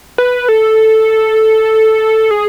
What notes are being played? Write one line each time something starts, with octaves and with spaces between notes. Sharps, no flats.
B4
A4
G#4